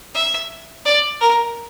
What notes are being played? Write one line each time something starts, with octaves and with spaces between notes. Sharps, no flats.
E5
D5
A#4